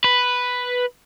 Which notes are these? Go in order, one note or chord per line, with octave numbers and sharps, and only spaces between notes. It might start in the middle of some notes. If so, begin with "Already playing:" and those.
B4